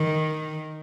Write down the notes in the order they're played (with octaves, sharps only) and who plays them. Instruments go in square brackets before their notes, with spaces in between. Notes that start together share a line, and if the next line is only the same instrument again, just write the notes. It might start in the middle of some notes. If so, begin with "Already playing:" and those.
Already playing: [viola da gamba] D#3